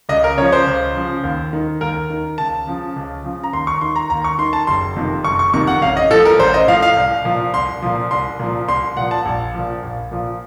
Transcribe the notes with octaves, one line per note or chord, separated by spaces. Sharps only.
C#2 D#5
A#4
C#3 F3 C#5
C5
C#2
C#3 F3
D#2
D#3
D#2 A#4
D#3
C#2 A5
C#3 F3
C#2
C#3 F3
A#5
D#2 C6
C#6
D#3 C6
A#5
D#2 A#5
C#6
D#3 C6
A5
F#1 C6
F2 C3 D#3
F#1 C#6
C#6
F2 C3 D#3 C#6
F#5
A1 F5
D#5
A2 F3 A4
A#4
A1 C5
D#5
A2 F3 F5
F5
C2
A#2 F3
C2 C6
A#2 F3
C2 C6
A#2 F3
C2 C6
A#2 F3 F#5
A5
A#1
A#2 F3
A#1
A#2 F3